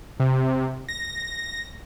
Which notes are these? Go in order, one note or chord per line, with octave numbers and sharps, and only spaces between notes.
C3
A#6